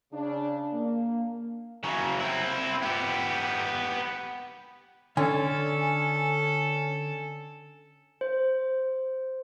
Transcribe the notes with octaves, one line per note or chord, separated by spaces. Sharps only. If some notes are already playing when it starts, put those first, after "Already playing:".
C#3 D4
A#3
C#3 F#3
C4 E4
B3 G4
D3 C#4 A4 G#5
C5